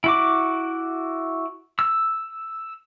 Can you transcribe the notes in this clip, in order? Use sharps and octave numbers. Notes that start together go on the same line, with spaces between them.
E4 F#4 D6
E6